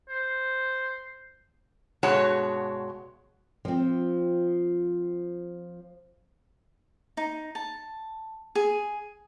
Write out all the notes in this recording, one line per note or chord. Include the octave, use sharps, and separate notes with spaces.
C5
G2 B2 G#3 F#4 C#5 A5
F3 C4
D#4
A5
G#4